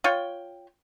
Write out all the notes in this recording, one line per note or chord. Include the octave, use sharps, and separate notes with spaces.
F4 C#5 G5